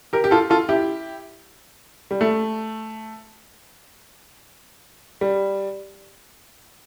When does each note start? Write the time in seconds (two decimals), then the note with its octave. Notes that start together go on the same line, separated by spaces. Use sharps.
0.13 G4 A#4
0.24 G4
0.31 F4 A4
0.50 F4 A4
0.69 E4 G4
2.11 G3
2.21 A3
5.21 G3